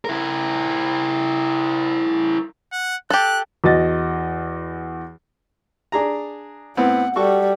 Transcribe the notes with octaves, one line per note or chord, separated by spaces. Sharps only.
E4 A#4
F#5
G4 A4 F#6
E2 F#4 D#5 A6
D4 G#4 A#5
A2 B3 C4 F#5
G3 F#4 A4 C#6